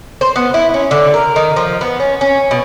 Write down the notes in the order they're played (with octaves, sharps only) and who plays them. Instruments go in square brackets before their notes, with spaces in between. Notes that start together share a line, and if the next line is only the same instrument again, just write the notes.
[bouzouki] C5
B3
E4
C#4
D3
A#4
D#3
F3
B3
C#4
C#4
B2